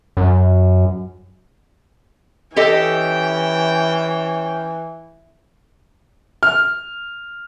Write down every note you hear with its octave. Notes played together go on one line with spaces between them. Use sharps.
F#2
E3 C#4 G4 A4 D#5 G5
F6